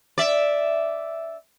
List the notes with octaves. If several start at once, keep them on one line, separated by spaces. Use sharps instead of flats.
D5 E5